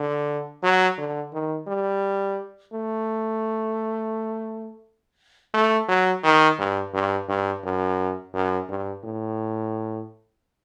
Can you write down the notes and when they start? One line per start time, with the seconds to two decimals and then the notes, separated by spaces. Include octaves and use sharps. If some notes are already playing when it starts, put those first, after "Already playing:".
Already playing: D3
0.64 F#3
0.98 D3
1.33 D#3
1.68 G3
2.73 A3
5.54 A3
5.89 F#3
6.24 D#3
6.59 G2
6.94 G2
7.29 G2
7.64 F#2
8.34 F#2
8.69 G2
9.04 A2